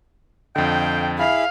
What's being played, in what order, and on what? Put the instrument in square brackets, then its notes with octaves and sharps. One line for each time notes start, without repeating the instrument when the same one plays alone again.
[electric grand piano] F2 D3 [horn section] D#5 F5 G5
[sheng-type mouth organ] E4 G#4 B5 [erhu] F5